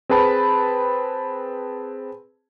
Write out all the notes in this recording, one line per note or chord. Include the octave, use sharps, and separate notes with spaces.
C4 G#4 B4 A5 B5